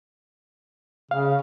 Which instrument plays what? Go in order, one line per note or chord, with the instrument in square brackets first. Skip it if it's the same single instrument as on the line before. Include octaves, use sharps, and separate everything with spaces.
[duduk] C#3 [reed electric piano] F5